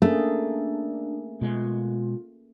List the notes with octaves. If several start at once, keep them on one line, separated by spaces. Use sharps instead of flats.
A3 A#3 C#4 D4 G#4
B2 G#3 F4